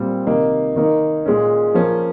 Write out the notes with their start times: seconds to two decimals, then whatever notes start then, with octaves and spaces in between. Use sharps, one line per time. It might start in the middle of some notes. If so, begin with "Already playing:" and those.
Already playing: A#2 G3 C4
0.27 C3 D#3 A#3 D#4
0.76 D#3 A#3 D#4
1.26 A#2 G#3 C#4
1.74 F3 A#3 C#4